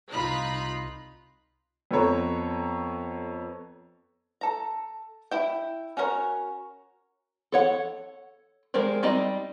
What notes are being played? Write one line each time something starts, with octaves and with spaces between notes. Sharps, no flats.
C2 D#4 F4 B5 F#6
F2 B3 A4 C#5 A#5
A4 A#5
E4 G5
C#4 F#4 A#4 B4 C#5
A4 C#5 F#5
G#3 G4 A#4 C5 D5
G3 C4 D#4 D5 D#5